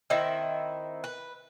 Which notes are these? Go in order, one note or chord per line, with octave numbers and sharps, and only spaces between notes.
D#3 C4 E4 E5
B4